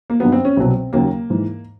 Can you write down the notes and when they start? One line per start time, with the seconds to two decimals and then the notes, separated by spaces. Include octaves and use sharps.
0.10 A#3
0.20 G2 D#3 F#3 B3
0.32 C4
0.45 C#4
0.56 C2 B2 F#3 C4
0.93 D#2 C#3 F#3 A#3
1.30 G#2 E3